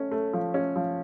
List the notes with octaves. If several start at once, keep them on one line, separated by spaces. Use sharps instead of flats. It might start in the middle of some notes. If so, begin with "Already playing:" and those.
Already playing: A3 C#4
A3
F3
C#4
F3